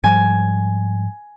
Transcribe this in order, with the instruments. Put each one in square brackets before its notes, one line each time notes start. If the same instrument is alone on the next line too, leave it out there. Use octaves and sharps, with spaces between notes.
[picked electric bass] G#2 F3 G3 [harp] G#5